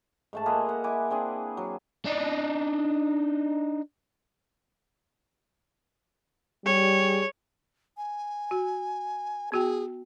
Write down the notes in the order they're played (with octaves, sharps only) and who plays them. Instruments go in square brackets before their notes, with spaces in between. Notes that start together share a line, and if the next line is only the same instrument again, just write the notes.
[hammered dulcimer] G#2 A3 A5
A#3 F4 G#4 B4
D#5 F#5
E4 G#5 D6
C4 D4 G#4
F#3
[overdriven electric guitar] D4 D#4
[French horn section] G3 G#4 [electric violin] C#5
[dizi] G#5
[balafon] F#4
[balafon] B3 F#4 G5 [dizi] G#4